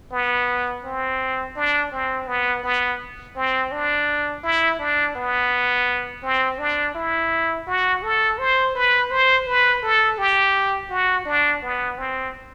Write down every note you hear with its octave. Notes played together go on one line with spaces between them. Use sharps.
B3
C4
D4
C4
B3
B3
C4
D4
E4
D4
B3
C4
D4
E4
F#4
A4
C5
B4
C5
B4
A4
G4
F#4
D4
B3
C4